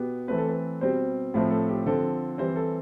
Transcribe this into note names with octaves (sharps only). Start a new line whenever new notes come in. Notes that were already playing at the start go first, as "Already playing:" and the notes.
Already playing: B2 B3 G4
E3 A3 C4 B4
A4
B4
B2 G3 C4 C5
A2 F3 A3 C4
A4
G4
D3 F3 C4 A4
E3 G3 C4 C5
A4